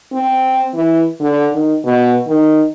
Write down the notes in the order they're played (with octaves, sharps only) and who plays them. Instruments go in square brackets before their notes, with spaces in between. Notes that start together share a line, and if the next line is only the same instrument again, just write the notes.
[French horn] C4
E3
D3
D#3
B2
D#3